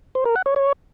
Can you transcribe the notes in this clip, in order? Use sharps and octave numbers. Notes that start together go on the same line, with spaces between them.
C5
A#4
F#5
C#5
C#5